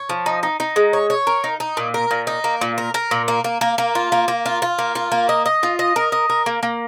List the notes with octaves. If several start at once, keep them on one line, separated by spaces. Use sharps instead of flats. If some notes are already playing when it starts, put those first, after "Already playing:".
Already playing: C#5
F3
D#4
D#4
D#4
G#3
C#5
C#5
A#4
D#4
D#4
A#2
A#4
A#2
D#4
A#3
A#2
A#4
A#4
A#2
A#3
A#3
A#3
A#3
F4
A#3
A#3
F4
F4
A#3
F4
A#3
D#5
D#5
F4
D#5
A#4
D#5
A#4
A#3
A#3